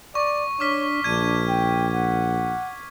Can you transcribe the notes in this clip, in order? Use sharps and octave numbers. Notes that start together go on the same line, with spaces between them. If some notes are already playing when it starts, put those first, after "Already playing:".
D5 C#6
D4 C#5 D6 F6 B6
A#1 D4 G#6 D#7
G5
F#5